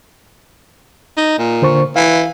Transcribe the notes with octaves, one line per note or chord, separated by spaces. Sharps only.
D#4
A#2
D3 C5 C#6
E3 F5